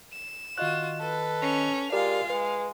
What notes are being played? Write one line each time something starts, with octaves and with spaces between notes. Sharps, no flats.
E7
D#3 F4 F#4 D#5 F#6
A4 B4
C#4 F7
G#3 F4 G4 A#4 D5 F5
G#3 B4